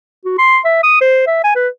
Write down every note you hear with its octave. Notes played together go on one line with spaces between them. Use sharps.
F#4
C6
E5
D#6
C5
E5
G#5
B4